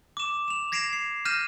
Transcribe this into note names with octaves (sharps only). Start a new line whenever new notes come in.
D6 E7
E7 F7
G#6 A#6 C7 D7 E7 F7
C7
F6 G6 A#6 D#7 E7